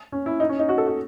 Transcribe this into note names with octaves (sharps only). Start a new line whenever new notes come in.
C#4
E4
D#4
C#4
D#4
F#4
A4
F#4